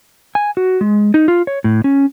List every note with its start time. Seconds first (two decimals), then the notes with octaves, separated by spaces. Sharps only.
0.35 G#5
0.57 F#4
0.81 G#3
1.14 D#4
1.28 F4
1.47 C#5
1.64 A2
1.84 C#4